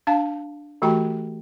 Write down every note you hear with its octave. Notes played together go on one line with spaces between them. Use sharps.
D4 F5 A5
E3 A3 F#4 G4 G5 A#5